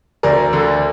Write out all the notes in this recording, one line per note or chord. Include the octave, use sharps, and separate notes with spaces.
D2 A#4 D5
D3